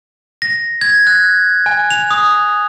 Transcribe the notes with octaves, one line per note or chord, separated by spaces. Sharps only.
A#6
G#6
F#6
G#5
F7
D#6